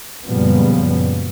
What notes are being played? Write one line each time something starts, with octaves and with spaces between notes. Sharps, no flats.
F#2 A#2 C#3 F3 G3 B3